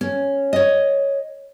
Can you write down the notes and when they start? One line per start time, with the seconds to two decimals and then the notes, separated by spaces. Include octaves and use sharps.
0.01 C#4
0.53 C#5 D#5